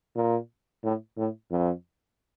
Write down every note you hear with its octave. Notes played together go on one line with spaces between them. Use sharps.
A#2
A2
A2
F2